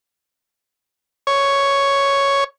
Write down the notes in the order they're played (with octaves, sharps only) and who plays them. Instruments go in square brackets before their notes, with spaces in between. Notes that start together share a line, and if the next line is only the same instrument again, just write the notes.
[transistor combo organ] C#5